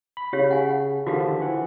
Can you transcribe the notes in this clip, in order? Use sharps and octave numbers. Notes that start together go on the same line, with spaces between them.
B5
C#3 G4 C#5 F5
F#5 G#5
D3 D#3 F3 F#4 G4 F5
E3 F#5